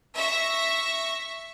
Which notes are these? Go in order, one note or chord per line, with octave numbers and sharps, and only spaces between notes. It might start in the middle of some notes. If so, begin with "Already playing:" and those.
E5 C#6 A#6